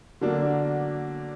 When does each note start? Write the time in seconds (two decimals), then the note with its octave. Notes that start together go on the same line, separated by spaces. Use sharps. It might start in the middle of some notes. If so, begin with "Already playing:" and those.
0.21 D3 F#3 A#3 D4